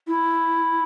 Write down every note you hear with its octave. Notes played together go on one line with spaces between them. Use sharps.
E4